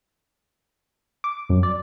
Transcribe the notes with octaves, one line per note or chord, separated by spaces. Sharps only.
D6
F#2
D5